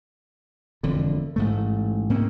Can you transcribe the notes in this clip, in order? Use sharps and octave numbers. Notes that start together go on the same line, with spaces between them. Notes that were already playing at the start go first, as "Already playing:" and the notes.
E1 F2 D3
A1 G#2 A3
G#2 A#3 C4 C#4